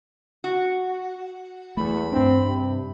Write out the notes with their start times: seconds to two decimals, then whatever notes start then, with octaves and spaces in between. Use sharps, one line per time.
0.44 F#4
1.77 E2 A3 B5
2.12 G2 C4 D4
2.46 C3